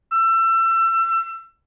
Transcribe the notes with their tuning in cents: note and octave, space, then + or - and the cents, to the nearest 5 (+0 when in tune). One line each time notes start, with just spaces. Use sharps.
E6 +30